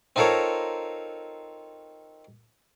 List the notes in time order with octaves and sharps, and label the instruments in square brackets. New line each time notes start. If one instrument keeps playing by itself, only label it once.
[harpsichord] C4 D#4 F4 A4 A#4 C#5